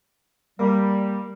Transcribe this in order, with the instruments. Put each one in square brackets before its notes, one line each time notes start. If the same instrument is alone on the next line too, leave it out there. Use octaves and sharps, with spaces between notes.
[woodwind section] G3 [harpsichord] A#3